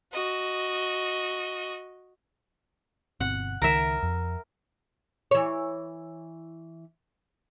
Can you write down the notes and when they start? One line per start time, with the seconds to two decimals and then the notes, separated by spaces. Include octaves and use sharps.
0.13 F#4 D#5
3.20 G1 B2 C4 F#5
3.62 C#2 D#3 A#4 E5
4.03 F2
5.31 E3 C#5